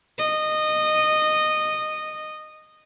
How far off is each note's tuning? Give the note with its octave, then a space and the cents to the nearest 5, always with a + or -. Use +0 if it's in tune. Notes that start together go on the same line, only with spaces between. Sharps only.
D#5 -15